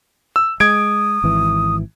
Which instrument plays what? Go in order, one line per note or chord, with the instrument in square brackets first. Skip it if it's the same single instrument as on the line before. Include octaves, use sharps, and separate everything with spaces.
[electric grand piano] E6
[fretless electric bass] G#3 [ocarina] D#6 [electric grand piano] G#6 D7
[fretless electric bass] G#1 E3